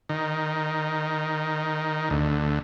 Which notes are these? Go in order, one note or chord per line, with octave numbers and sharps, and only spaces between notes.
D#3
D2